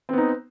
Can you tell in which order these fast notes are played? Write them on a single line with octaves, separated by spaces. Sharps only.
C4 B3 D#4